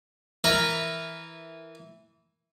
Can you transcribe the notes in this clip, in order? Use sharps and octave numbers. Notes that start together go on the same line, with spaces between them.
E3 A#4 B4 E5 A#5